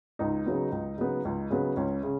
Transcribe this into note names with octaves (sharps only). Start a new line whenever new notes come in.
C#2 D#4
C#3 F#3 B3
C#2
C#3 F#3 B3
C#2
C#3 F#3 B3
C#2 C#4
C#3